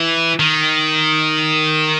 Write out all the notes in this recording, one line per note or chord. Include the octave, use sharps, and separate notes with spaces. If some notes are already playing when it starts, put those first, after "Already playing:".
Already playing: E3
D#3